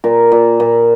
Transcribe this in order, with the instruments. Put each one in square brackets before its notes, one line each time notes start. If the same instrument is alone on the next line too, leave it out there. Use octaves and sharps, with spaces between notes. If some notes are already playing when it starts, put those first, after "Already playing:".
[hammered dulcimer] A#2 A#4
A#2
A#2